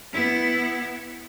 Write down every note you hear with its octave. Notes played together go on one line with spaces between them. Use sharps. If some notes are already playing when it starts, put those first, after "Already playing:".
B3 E4